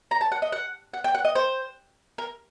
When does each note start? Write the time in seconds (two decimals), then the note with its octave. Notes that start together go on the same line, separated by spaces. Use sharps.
0.11 A#5
0.21 A5
0.32 F#5
0.42 D#5
0.52 F#5
0.94 F#5
1.04 G5
1.14 F#5
1.25 D#5
1.35 C5
2.18 A#4